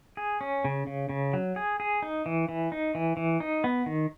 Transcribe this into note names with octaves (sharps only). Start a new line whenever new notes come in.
G#4
C#4
C#3
C#3
C#3
F#3
G#4
G#4
D#4
E3
E3
D#4
E3
E3
D#4
B3
D#3